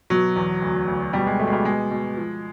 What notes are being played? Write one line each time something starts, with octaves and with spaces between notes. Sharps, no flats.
B2 F#3
E2
D2
D2
B2 G3
G#3
B2 A3
G#3
G3
B2 G#3
B2
F3